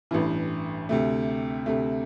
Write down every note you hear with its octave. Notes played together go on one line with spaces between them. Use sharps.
A1 G2 E3
D2 C3 A3
D2 C3 A3